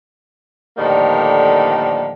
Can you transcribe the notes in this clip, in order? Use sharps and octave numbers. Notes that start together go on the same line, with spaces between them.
A2 D3 D#3 F3 G3 A#3